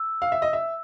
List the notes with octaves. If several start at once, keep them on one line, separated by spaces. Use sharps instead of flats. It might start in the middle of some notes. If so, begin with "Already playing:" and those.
Already playing: E6
F5
E5
D#5
E5